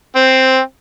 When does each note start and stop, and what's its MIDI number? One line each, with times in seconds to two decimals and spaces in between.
0.15 0.59 60